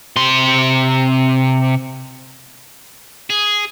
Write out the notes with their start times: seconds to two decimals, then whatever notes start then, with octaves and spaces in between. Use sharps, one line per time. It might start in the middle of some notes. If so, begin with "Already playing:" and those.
0.16 C3 C6
3.30 G#4